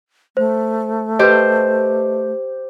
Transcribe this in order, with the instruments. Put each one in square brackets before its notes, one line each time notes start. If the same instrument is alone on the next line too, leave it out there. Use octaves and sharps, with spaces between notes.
[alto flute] A3 [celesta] C5
[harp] G4 C5 [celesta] B4 D#5